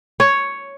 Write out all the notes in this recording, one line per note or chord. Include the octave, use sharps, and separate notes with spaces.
C#5